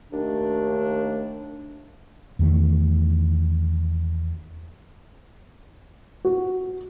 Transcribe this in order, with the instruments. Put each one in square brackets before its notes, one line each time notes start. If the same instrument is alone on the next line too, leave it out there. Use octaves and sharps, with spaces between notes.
[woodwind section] D#2 A3 D4
[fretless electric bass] E2 D#3 A3
[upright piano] F#4